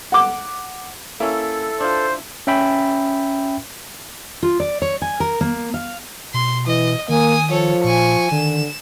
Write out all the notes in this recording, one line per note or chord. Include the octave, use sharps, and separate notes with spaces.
F#5 D6
A#3 C#4 E4 A4
D4 F4 C5
C#4 E5 G5 B5
F4
D5
C#5
G#5
A#4
A#3
F5
B2 C6
E3 D#5
D#3 A#3 G#5 D#6
F3 A4 C#5
A#2 G#5 C#6
D3 D#3 E7